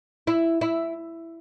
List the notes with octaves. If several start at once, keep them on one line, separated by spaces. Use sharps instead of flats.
E4
E4